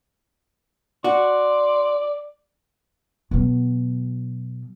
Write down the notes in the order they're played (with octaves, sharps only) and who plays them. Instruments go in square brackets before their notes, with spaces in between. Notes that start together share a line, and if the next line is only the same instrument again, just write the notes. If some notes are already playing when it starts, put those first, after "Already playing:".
[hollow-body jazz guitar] F#4 [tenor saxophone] D5 [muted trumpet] C6
[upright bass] B2 F#3